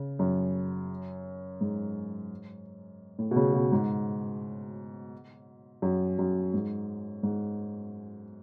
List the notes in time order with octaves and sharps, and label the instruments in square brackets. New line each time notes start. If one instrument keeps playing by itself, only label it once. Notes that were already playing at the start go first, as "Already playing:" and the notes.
Already playing: [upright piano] C#3
F#2
G#2
A2
B2
C#3
B2
G#2
F#2
F#2
G#2
G#2